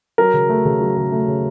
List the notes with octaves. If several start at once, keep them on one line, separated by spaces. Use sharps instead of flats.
F#3 A#4
C#3
A3
C#3
F#3
C#3
A3
C#3